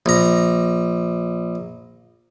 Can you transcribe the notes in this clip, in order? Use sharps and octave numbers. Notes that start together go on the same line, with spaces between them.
A#1 A#5